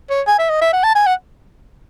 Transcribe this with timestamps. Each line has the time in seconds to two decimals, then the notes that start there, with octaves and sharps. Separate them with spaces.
0.10 C#5
0.27 G#5
0.39 E5
0.49 D#5
0.61 E5
0.73 F#5
0.83 A5
0.95 G#5
1.06 F#5